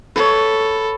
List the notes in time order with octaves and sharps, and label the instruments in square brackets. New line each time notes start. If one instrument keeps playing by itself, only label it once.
[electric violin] A4 [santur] B4 C#5